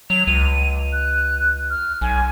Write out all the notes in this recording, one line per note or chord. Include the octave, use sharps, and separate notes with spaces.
F#3 F7
C#2 D#7
F#6
F6
B1 G#5